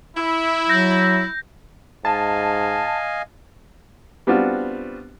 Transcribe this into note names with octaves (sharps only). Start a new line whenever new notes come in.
E4
F#3 G6 A#6
G#2 D#5 F5 G#5 A5
G3 B3 C4 D4 F4 F#4